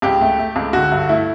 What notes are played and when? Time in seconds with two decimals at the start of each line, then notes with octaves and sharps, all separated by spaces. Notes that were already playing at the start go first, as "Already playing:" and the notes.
0.02 C#2 G4
0.21 A3
0.39 A3
0.56 C#2
0.73 D3 F#4
0.92 G2
1.09 A3 E4